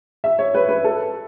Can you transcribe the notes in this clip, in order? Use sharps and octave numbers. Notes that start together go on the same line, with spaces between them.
E5
C#5
B4
B4
A4